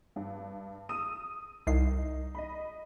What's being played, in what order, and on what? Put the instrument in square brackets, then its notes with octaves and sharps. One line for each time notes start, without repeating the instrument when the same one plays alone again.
[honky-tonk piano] G2
D#6 E6 D#7
[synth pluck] C2 C7 [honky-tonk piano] D#4
[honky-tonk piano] D#5 B5